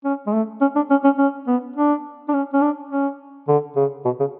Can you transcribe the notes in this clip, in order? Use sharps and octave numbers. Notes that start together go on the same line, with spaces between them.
C#4
G#3
A3
C#4
D4
C#4
C#4
C#4
B3
D4
D4
C#4
C#4
D4
C#4
D3
C#3
B2
C#3